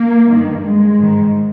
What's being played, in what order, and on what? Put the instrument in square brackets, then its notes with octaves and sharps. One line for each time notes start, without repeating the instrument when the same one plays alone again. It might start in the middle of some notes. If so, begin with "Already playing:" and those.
Already playing: [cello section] A#3
G2 D#3
G#3
G#2 D#3